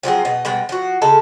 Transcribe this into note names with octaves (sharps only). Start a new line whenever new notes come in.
F3 F#3 C4 G#4
B2 D#5
B2 G3 G#3
F3 F#4
C#3 G#3 A4